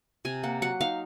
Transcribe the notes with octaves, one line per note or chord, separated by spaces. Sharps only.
C3 G#5
A#3 F#5
F#3 F#5
D#4 F5